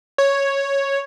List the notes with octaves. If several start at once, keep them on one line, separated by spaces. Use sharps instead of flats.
C#5